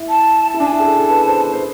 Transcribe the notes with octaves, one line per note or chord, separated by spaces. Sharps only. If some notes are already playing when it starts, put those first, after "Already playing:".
Already playing: E4
A5
E4
D4 A5
G#5
E4 A5
G#4
A4
A4
B4
C5
C5